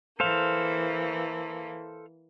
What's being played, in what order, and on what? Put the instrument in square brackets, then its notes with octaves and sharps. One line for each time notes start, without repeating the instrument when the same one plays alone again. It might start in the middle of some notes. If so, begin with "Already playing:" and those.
[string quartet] E3 A#3 [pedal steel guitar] A4 C5 F5